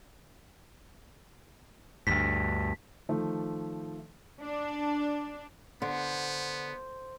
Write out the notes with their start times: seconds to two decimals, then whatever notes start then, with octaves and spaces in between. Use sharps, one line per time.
2.07 D2 G2 B6
3.09 D#3 F3 A3
4.41 D4
5.82 D3 B3 C5